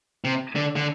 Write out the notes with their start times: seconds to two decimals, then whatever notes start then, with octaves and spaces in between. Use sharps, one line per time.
0.24 C3
0.56 D3
0.76 D3